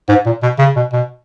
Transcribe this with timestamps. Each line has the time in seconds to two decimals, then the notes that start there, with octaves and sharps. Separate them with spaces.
0.09 G#2
0.26 A#2
0.43 B2
0.59 C#3
0.76 B2
0.93 B2